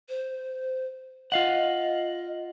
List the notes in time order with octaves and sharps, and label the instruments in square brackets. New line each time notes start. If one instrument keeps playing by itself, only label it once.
[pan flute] C5
[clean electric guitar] F4 F5 F#5 [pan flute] D#5